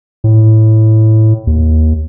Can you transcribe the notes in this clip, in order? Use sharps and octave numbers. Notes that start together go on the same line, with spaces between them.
A2
D#2